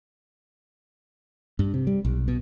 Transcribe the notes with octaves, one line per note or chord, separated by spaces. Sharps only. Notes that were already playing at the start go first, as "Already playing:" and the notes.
G2
C3
G3
B1
B2